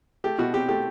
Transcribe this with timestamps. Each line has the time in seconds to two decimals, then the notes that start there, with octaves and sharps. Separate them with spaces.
0.24 A3 G4
0.38 B2 F#4
0.53 C4 G4
0.68 A3 G4